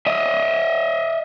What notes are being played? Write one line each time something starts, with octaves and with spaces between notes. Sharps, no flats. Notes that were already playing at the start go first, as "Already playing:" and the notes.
D#5 E5